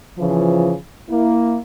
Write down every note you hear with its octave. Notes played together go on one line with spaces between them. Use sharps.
C#3 E3 F3
A#3 E4